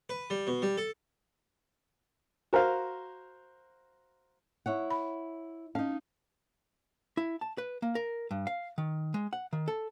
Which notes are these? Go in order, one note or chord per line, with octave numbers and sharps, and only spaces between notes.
B4
G3
B2
G3
A4
F#4 A#4 C5 F5
E4 C#5 F#5
B5
C#4 D#4 F5
E4
A5
B4
A#3
A#4
G2
F5
D#3
G#3
F#5
D#3
A4